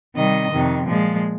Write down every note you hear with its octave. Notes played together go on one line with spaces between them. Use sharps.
C3 D#3 G3 D#5
F2 C3 D#3
A#2 F3 G#3